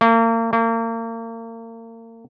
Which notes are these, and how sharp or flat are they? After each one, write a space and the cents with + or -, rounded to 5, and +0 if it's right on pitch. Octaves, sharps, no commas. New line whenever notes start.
A#3 -35
A#3 -35